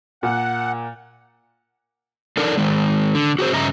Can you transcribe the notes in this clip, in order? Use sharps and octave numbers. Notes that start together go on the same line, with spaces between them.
A#2 F#5
D4 D#4 A4 A#4 D5
D#3 G#3
D3
F#4 G#4 C5
G2 C#3 D#5 E5 A#5